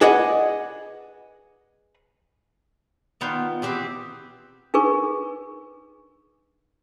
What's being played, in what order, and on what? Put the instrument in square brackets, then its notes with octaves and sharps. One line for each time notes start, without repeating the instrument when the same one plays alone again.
[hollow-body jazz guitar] G#4 B4 D5 D#5 F#5
[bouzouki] D#3 B3 F4 G5
E3 C4 G4 G#4
[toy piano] D4 D#4 G#4 A#4 B4 C#6